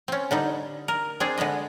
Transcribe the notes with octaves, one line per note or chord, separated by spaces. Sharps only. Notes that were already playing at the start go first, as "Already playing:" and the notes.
C4 C#4
D3 G3 D#4
A#4
C4 D4 G#4
D3 G#3 B4 D#5